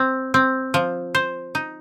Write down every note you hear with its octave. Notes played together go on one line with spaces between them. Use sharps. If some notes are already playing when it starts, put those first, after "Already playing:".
Already playing: C4
C4
F3
C5
D#4